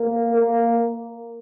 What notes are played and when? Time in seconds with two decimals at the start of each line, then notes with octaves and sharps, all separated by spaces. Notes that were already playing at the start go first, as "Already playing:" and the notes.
Already playing: A#3
0.34 A#3